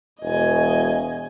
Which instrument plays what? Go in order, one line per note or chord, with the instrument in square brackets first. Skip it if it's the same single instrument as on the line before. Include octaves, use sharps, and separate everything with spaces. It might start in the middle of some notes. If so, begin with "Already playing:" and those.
[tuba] E1 [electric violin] D#5 G#5